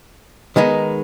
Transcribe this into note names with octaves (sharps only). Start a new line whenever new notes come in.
D#3 G#3 B3 D#4